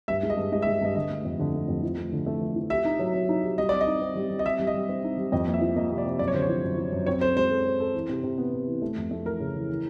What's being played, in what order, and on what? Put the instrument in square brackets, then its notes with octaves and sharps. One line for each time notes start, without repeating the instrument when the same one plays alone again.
[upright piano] G2 [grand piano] E5
[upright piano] G#3
[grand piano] D#5
[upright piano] G2
[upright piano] G#3 [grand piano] D#5
[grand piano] E5
[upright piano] G#3
[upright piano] G2 [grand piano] D#5
[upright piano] D3 [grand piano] D#5
[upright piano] A3
F2
D3
A3
F2
F3
A3
D3
A3
F3
F3
[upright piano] G4 [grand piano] E5
[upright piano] D#4
F#3
F#3
D#4
G4
[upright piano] G3 [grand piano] D#5
[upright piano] C4 [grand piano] D5
[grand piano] D#5
[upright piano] D#4
C4
G3
G3
[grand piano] D#5
[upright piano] C4 [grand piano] E5
[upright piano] G3
[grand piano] D#5
[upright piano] G3
C4
D#4
G3
[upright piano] F2 [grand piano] D#5
[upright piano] A#3
[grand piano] E5
[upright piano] F3
[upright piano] A#3 [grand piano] D#5
[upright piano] C3
[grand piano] D5
[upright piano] C3
[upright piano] F#2 [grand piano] D5
[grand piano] C#5
[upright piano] D3 [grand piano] C5
[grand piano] C#5
[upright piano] F3
F#2
F3
F#2
[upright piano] C4 [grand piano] C#5
[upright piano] A4 [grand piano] C5
[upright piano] G#3 [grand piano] C5
[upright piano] A4
A4
A4
E3
C3
C3
B3
C3
E3
A3
F2
A3
[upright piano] E3 [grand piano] A#4
[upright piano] C#3
E3
E3